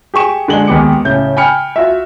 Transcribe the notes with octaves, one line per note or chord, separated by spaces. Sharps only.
G4 G#4 C#6 E7
D3 G#3 F#7 G7
D#2 G#3 B3 G4 D6 C#7
A2 C#3 G6
G5 G#5 B5 F6 C#7
F4 F#4 E5